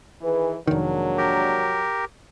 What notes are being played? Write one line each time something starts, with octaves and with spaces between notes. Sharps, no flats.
D#3 E3 G#4 B4
F1 D#3 F#3 G#3 A#3 D4
G4 A#4